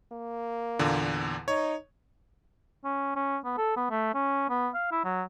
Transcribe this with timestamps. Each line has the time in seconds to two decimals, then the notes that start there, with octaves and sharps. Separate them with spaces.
0.12 A#3
0.79 E2 A#2 D3
1.48 D#4 C#5
2.84 C#4
3.16 C#4
3.45 B3
3.58 A4
3.77 B3
3.90 A3
4.14 C#4
4.50 B3
4.74 F5
4.92 E4
5.04 F#3